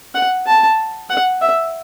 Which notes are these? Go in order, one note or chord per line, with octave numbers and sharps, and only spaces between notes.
F#5
A5
F#5
E5